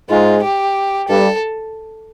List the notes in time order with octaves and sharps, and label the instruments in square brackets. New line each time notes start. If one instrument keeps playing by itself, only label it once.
[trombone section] G#2 G#3 [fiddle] F4
[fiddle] G4
[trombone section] G2 G3 [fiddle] A4